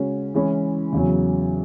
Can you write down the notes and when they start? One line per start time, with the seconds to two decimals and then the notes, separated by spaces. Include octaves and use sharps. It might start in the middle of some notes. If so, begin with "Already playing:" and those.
Already playing: C#3 G#3 C#4 F#4
0.34 E3 G#3 C#4 E4
0.93 E2 C#3 F#3